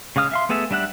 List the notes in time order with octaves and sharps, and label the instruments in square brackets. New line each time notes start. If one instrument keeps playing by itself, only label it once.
[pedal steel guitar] C#3 G#3 F5 D#6 F6
E5 F5 C6
A3 B3 G#4 A4 E5
G3 D4 E5 F#5 F#6